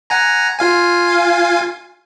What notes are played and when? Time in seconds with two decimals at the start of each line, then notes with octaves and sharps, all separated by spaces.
0.10 F#5 G#5 A#5
0.59 F4 F5 G#5